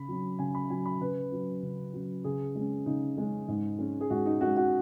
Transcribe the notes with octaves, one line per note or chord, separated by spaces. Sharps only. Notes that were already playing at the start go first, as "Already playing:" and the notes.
Already playing: C#3 B5
F#3 C#4
C#3 G#5
B5
F#3 C#4 G#5
B5
C#3 B4
F#3 C#4
C#3
F#3 C#4
C#3 G#4
G#3 C#4
C#3 D#4
G#3 C#4
G#2
G#3 C#4
G#4
G#2 F#4
D#4
G#3 C#4 F#4
F#4